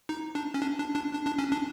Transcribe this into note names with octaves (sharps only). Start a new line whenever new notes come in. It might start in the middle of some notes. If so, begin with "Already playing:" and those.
D#4
D4
C#4
D4
D4
D4
D4
D4
C#4
D4